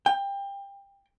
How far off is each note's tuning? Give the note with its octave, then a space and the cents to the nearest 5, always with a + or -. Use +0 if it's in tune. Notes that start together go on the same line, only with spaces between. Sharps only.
G5 +25